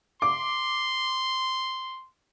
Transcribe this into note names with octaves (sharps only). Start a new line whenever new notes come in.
C6 D6